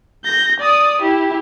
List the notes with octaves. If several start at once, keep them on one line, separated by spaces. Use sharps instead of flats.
G6 A#6
D5 D#6
E4 G4